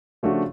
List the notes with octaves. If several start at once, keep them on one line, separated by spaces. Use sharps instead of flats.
C#3 F3 A3 D4 F#4